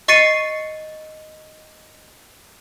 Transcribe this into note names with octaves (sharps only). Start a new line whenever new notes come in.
D#5 C#6 A6 C7 C#7 D#7